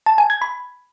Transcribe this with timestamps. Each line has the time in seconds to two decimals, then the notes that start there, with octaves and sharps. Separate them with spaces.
0.06 A5
0.18 G#5
0.30 G#6
0.42 B5